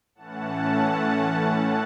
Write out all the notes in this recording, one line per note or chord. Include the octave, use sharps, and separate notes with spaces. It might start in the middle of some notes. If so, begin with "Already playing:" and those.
A2 E3 A3 C#4 F#5 A5